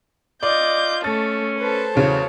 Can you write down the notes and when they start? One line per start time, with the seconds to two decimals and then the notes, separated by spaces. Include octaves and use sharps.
0.43 F4 D5 D#5 D6 G6
1.04 A3 C#4 A4 A6
1.59 A4 B4 C5 A5
1.96 E2 C#3 E3 F#3 C#5